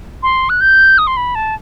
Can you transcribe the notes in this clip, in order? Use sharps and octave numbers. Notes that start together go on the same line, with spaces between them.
C6
F#6
G6
D#6
C6
B5
A5